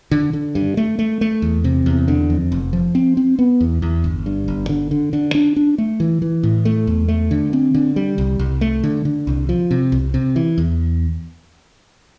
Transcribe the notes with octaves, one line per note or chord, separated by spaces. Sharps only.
D3
D3
G2
A3
A3
A3
E2
C3
E2
D3
F2
F1
F3
C4
C4
B3
E2
E2
G1
G2
G1
D3
D3
D3
D4
D4
A3
E3
E3
A2
A3
E2
A3
D3
C4
D3
G3
C2
C2
A3
D3
D3
C2
F3
C3
C2
C3
E3
E2